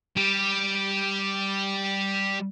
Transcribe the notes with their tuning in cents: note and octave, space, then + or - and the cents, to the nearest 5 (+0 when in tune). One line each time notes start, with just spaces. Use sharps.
G3 +0 G4 +0